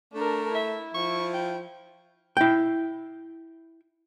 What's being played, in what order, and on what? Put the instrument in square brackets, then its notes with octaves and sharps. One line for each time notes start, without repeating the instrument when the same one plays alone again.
[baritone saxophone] A3 [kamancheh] D4 A#4
[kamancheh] E4 [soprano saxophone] E5
[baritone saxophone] F3 [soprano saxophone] C#6
[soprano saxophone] G5
[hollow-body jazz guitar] E4 G5